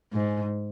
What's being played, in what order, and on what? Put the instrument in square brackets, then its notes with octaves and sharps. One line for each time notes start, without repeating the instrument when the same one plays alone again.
[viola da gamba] G#2